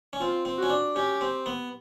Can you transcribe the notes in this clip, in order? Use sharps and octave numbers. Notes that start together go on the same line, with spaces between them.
C#4
C4 F4
C4
F#4
C#4
D4
C#4 G4
C4
B3